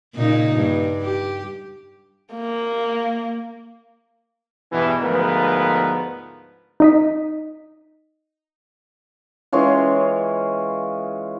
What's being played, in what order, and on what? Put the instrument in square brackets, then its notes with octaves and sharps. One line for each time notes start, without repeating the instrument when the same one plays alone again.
[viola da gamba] A#2 C#3 D#4
G2
G4
[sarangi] A#3
[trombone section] E2 G2 B2 E3
D2 G#2 F3 B3 A#4 B4
[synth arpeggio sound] D#4 D#5 B6
[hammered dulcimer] E3 G#3 C#4 F4